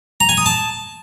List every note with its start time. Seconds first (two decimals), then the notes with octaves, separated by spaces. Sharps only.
0.20 A#5
0.29 G#5
0.37 D#6
0.46 A5